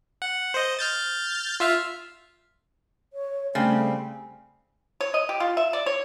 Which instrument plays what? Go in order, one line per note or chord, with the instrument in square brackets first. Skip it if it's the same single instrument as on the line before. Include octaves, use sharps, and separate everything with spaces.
[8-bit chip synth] F#5
C5 D#5
F6 G6 A6
F4 E5 F5
[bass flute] C#5
[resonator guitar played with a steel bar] C#3 [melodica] G3 C4 [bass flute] A3
[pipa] C#5
D#5
G4
F4
E5
D5
C#5